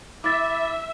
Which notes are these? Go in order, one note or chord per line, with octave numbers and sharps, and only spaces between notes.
E4 E5 D6 A6